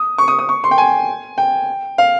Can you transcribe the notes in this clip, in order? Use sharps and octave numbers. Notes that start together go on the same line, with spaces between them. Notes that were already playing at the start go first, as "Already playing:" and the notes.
Already playing: D#6
C#6
D#6
D#6
C#6
C6
G5
G#5
G5
F5